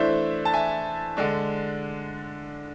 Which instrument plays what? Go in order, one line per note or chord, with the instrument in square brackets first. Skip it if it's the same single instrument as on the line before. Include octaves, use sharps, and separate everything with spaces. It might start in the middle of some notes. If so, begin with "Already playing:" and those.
Already playing: [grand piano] E3 A3 D4 C5 E5
A5
E5 G#5
D3 G#3 D4